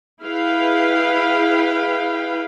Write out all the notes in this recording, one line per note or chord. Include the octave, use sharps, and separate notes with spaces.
E4 G#4 B4 F5 G5